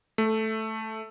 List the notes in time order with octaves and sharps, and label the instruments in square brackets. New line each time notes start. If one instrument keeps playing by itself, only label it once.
[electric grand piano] A3